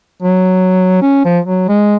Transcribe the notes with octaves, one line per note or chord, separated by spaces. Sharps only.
F#3
C#4
F3
F#3
G#3